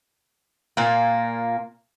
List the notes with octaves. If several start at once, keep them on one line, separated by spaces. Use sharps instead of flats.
A#2 A#3